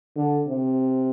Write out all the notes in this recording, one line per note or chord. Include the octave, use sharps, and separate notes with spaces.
D3
C3